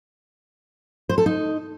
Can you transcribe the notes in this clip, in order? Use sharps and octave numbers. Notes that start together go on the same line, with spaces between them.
C5
A4
D#4